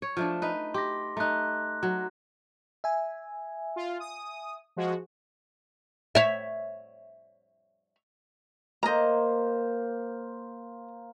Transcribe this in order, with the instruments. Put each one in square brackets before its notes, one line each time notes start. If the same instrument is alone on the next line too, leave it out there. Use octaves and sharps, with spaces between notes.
[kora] C#5
F3 A3 D4
D#4 B4
[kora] G4 [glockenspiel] C6 D6 A#6
[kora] A3 D#4 [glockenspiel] A#5 F#6
[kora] F#3
[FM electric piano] E5 G#5
[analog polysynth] F4
D#6
F3 G#3 F#4
[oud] C#5 E5
[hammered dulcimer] A#3 C5 [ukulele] D#5 A#5